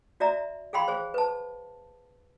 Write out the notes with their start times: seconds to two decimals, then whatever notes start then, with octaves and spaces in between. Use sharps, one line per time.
0.20 F#4 D5 E5 A#5
0.73 G#4 F5 G5 B5 C6
0.88 G#4 C5
1.14 B4 A5